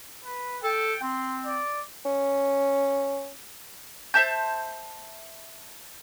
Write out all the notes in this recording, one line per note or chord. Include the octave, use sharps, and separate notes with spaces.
B4
A4 G5
C4 C6
D5
C#4
C5 E5 A5 G6